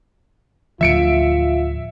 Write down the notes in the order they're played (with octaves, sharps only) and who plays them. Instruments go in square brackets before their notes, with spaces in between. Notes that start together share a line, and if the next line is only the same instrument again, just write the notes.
[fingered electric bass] D1 D2 F3 [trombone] F4 [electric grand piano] E5 C#7 D7